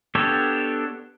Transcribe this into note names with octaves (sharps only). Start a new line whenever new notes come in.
B3 D4 G4 A4 C#5